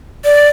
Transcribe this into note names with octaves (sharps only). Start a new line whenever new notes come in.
D5